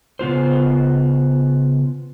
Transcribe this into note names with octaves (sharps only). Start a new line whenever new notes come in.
C#3 B3 F4 C5